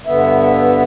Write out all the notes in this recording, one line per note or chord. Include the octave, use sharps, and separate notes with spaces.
G2 D3 B3 E5